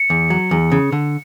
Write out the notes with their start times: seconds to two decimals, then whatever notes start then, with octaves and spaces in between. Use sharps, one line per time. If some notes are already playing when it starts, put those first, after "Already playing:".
Already playing: C#7
0.10 E2
0.30 F#3
0.51 E2
0.72 C#3
0.92 D3